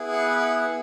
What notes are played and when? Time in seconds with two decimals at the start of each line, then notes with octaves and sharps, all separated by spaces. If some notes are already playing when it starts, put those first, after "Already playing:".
Already playing: B3 E4 G#4
0.13 F#5
0.40 F#5